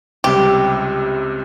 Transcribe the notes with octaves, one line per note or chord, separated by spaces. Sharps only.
C#2 C3 G3 G4